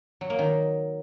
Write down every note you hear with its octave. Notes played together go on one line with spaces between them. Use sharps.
F#3
A#3
D#3